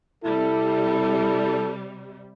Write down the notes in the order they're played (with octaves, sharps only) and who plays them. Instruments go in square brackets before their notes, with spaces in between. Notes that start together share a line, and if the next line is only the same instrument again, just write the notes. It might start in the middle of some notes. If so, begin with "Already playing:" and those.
[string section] C3 G3 [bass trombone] E4 [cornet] A4